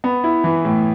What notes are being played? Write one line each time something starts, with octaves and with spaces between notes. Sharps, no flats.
B3
E4
E3
A2